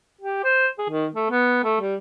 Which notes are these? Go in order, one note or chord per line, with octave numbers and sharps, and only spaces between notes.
G4
C5
G#4
D#3
A3
B3
A3
G3